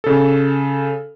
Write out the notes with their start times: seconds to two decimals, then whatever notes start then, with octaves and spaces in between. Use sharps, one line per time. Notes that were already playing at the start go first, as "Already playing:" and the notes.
0.04 C#3 A4